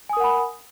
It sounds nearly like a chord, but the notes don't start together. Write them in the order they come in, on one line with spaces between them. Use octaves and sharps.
G#5 D#6 A#4 F#5 B5